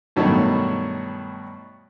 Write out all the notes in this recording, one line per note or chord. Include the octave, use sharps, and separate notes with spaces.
G2 B2 D#3 F#3 A3